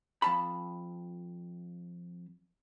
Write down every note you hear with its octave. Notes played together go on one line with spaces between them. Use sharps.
F2 A5 B5